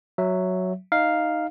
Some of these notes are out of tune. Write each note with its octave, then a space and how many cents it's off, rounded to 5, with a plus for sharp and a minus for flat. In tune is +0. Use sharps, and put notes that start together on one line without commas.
F#3 +0 E5 +0
D#4 +0 F5 +0